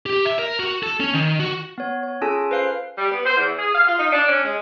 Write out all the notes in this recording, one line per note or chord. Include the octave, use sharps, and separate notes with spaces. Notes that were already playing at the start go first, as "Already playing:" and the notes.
G4
E5
A#4
F#4
A4
C#4
D#3
F#4
B3 C#5
C#5
C#4 F4 G#4 A4 G#5 A5
B4 C5 F5 F#6 C7
G3
B3
C5
E2
G#4
F5
F4
D#4
D4
C#4
G#3